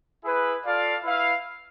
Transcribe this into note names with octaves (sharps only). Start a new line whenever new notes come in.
E4 G#4 B4
F4 A4 D5 F5
E4 B4 F5